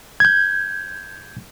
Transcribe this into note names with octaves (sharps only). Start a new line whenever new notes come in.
G6 G#6